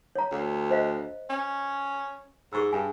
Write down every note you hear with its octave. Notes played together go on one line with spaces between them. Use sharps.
C#5 A#5
D2
C5 D#5 F5
C#4
G#2 G#4 C#6 E6
G2 G#5